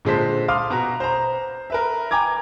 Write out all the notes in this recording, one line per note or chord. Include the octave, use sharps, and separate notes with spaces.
A#2 D3 G#3 A4 C5 B6
F5 C6 D6 D#6 F6
B2 F#4 A#5
C5 A#5
A#4 B4 E5
G5 G#5 A#5 D6 G#6